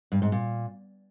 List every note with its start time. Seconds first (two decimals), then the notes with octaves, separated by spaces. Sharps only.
0.12 G2
0.22 G#2
0.32 A#2